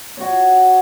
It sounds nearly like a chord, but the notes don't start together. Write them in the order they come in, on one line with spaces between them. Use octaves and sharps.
C#5 F#4 F#5